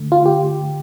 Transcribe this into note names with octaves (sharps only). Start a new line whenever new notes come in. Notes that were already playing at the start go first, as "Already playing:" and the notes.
Already playing: D3 A3
F4
G4